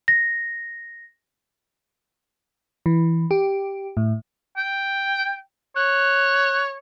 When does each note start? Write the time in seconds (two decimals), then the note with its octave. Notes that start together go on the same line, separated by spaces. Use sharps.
0.08 A#6
2.86 E3
3.31 G4
3.97 A2
4.57 G5
5.76 C#5 F#6